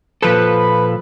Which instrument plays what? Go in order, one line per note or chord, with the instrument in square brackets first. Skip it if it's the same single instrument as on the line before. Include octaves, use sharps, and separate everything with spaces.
[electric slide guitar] A#2 F3 A4 [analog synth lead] B4